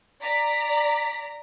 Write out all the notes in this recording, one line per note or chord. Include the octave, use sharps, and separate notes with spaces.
D5 A#5 B6